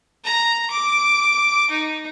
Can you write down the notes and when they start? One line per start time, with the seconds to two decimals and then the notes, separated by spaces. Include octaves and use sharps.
0.24 A#5
0.71 D6
1.70 D#4